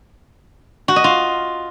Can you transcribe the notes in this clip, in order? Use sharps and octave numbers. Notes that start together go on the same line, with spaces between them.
F#4
D#5
F4